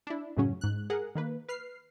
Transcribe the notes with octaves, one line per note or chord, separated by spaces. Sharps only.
D4 E4
F#2 A2 C#3 F#3 C#4
G#2 F#6
G#4 A#4 F#5
D#3 A#3 B4
B4 F6 C7